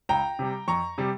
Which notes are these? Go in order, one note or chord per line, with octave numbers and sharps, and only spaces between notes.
C#2 G5 A#5
C3 G3
F2 A#5 C#6
C3 G3